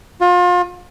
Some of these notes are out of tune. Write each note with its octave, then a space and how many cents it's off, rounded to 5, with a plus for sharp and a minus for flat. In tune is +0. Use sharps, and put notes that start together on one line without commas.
F4 +35